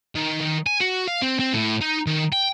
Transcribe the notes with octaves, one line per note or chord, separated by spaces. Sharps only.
D#3
D#3
G#5
F#4
F5
C4
C4
A2
D#4
D#3
G5